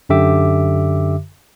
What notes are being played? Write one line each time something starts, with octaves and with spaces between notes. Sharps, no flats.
F#2 D3 G4 E5 D6